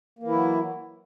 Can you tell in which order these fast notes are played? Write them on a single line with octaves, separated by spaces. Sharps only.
A#3 E3 E4 F#3